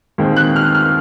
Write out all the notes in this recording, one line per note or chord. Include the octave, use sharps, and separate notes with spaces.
D#2 D#3 G#3 C4
F#6
F6
F6